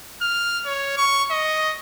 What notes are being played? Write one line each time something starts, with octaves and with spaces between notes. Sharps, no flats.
F6
C#5
C#6
D#5